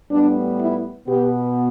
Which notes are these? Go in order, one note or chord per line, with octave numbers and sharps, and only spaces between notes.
A2 G3 B3 D4
E4
B2 B3 G4